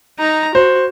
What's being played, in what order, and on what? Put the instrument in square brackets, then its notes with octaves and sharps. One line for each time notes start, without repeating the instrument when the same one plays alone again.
[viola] D#4 A#5
[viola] F#4 [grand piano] C5